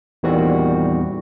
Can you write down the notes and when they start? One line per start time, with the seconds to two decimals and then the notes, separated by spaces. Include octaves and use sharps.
0.23 E2 A#2 D#3 G3 C4 F#4